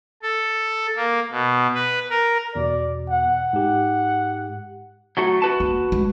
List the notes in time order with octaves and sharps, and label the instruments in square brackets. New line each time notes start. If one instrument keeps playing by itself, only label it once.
[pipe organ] A4
A#3
B2
B4
A#4
[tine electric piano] E2 B2 [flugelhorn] D5
[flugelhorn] F#5
[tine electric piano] G#2 G4
[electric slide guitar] F#3 A3 F#4
F#4 B4 A5
[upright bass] A#3
G#3